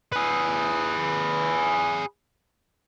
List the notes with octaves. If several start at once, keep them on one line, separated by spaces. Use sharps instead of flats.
G#4 B4